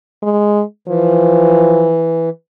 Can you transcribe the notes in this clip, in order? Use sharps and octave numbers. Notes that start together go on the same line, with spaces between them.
G#3
E3 F3